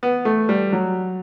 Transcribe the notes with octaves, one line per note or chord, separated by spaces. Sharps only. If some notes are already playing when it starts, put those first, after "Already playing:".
B3
A3
G3
F#3